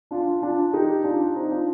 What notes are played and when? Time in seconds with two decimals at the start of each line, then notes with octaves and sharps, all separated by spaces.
0.11 D4 F4
0.42 D4 F4
0.73 D#4 G4
1.04 D4 F4
1.36 C4 D#4
1.51 D4 F4